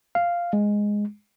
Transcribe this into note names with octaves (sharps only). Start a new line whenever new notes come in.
F5
G#3